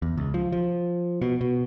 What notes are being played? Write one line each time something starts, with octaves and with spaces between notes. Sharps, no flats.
E2
C#2
F3
F3
B2
B2